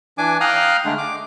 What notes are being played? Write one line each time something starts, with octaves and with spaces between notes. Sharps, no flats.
E3 D4 G#5 D6
F5 G5 A#5 D#6 F6 F#6
D3 G#3 A3 D4
D6